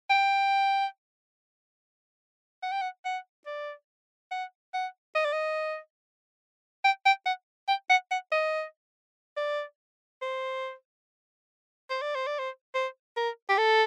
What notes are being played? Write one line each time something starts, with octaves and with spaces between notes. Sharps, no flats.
G5
F#5
G5
F#5
F#5
D5
F#5
F#5
D#5
D5
D#5
G5
G5
F#5
G5
F#5
F#5
D#5
D5
C5
C5
D5
C5
D5
C5
C5
A#4
G4
A4